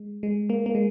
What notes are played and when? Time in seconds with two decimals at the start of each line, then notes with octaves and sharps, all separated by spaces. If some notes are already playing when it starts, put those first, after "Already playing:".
Already playing: G#3
0.23 G#3
0.50 A#3
0.66 A#3
0.75 G#3